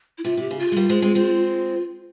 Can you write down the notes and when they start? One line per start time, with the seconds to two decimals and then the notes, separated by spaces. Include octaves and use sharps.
0.18 E4
0.24 C3 F4
0.37 C3 G4
0.51 C#3
0.59 F4
0.72 G#3
0.76 G3 A#3
0.89 G#3 C4
1.02 G#3 C4
1.15 G#3 C4